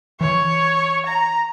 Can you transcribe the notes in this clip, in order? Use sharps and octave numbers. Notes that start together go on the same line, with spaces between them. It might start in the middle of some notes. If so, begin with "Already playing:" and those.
E3 C#5
A#5